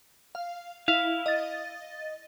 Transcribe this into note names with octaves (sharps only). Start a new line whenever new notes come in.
F5
E4 F5
D#5 A6